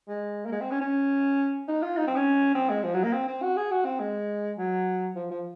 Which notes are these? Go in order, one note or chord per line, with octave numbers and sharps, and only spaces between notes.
G#3
A#3
G#3
C4
C#4
C#4
D#4
F4
D#4
C4
C#4
C4
G#3
F3
F#3
A#3
C4
C4
F#4
G#4
F#4
C4
G#3
F#3
F3
F3